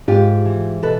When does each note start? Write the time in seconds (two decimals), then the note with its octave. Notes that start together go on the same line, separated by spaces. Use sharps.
0.08 G#2 F4 G4
0.45 E3
0.83 B2 A4 B4